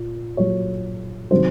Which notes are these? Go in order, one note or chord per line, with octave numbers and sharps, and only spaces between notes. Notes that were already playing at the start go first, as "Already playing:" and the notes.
Already playing: A#2
A#2 F#3 C#5
C3 D#3 F#3 C5